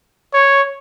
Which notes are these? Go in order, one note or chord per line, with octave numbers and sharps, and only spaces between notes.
C#5